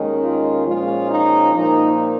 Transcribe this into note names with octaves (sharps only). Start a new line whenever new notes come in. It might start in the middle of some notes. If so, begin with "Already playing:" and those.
Already playing: D#2 D#3 G#3 C#4
F4
A#2 F3 G#3 C#4 F4
D#4
A#2 F3 A#3 D#4